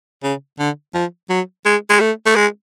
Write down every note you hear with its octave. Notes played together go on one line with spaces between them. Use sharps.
C#3
D3
F3
F#3
G#3
G#3
A3
A3
G#3